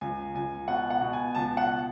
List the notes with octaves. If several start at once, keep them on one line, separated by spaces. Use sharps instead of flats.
C#2 G#5
C#2 G#5
B2 F#5
F#5
B2
G#5
C#2 A5
F#5